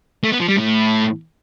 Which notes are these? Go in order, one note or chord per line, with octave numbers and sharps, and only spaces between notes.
A3
B3
F3
G3
A2